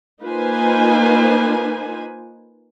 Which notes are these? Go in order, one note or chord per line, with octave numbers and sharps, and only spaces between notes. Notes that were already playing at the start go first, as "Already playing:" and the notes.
A#3 D#4 F4 B4 C5 G#5